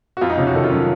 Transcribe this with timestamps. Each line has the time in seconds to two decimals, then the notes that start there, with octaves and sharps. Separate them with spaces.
0.17 F#4
0.21 F2 F4
0.30 D#4
0.38 C3 C#4
0.47 F#4
0.55 D#3 A4
0.64 F4
0.71 F#3 C#4